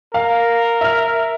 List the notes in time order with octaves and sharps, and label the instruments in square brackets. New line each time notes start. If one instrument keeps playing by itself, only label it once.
[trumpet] A#4 [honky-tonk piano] F5
[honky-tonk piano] E5 F6